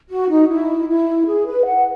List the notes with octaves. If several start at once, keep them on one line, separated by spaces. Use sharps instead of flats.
F#4
D#4
E4
E4
G#4
B4
F#5